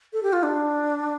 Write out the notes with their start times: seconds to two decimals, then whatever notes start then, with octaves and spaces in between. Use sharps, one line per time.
0.13 A4
0.23 G4
0.33 F4
0.43 D4